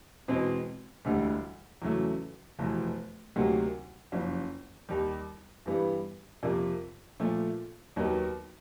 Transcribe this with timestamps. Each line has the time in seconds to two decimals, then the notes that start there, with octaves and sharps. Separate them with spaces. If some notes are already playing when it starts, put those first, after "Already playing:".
0.28 E2 B2 G#3 C4
1.05 E1 D2 D3 G3
1.82 E2 C#3 F#3 A3
2.59 F1 E2 B2
3.36 D2 C3 D#3 F#3 A#3
4.12 F#1 F2 C#3
4.89 D#2 D#3 G3
5.66 G2 E3 G3 B3
6.43 F2 C3 F3 A#3
7.20 A#2 F3 A3
7.96 D#2 D#3 F#3 B3